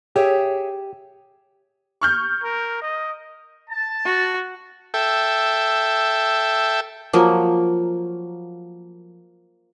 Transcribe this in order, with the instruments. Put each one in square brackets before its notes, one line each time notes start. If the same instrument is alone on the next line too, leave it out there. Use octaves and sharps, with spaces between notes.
[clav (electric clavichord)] G4 [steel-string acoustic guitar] G#4 C#5 E5
[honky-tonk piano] C#6 F6 G6
[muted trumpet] A#4
D#5
[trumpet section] A5
[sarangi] F#4
[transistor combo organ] A4 E5 G5
[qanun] F3 F#3 A#3